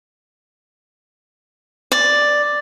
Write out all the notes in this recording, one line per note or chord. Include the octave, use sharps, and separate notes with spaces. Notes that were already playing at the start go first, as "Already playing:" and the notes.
D5